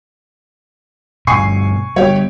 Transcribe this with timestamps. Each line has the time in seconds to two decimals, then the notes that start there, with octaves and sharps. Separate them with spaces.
1.27 G2 B2 G#5 C#6 C7
1.96 G3 B3 G4 C#5